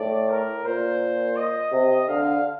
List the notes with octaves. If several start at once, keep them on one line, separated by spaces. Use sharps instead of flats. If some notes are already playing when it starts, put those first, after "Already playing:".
Already playing: A2 D5
A#4
A#2 C5
D#5
C3
D3 F5